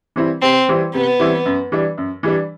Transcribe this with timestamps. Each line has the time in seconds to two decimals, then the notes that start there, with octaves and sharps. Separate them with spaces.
0.16 E3 G3 C4 E4
0.42 C3 C4
0.69 E3 G3 C4 E4
0.94 C3 B3
1.19 E3 G3 C4 E4
1.45 F#2
1.72 E3 G3 D4
1.97 F#2
2.23 E3 G3 D4